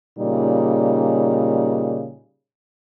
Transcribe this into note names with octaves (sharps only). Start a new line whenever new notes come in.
A#2 C#3 G3 D#4